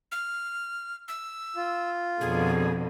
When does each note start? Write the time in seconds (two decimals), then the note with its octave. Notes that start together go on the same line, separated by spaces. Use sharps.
0.12 F6
1.08 E6
1.56 F4
2.21 F2 B2 D3 G#4